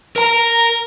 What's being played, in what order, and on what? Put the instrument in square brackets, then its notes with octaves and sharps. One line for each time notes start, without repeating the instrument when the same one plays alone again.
[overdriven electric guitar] A#4 A#5